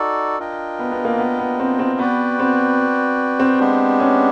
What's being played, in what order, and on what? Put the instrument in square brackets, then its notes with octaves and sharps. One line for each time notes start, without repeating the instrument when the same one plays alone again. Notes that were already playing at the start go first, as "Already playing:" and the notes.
Already playing: [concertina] D#4 F#4 A4 D5
D4 F4 A#4 D#5 G5
[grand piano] B3
B3
A#3
B3
B3
C4
C4
[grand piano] B3 [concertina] F#4 B4 D5 G5
[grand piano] C4
C4
[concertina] G#3 B3 D4 G4
[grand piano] C#4